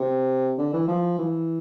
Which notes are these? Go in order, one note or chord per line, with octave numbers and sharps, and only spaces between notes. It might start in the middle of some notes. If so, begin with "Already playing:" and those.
Already playing: C3
D3
E3
F3
E3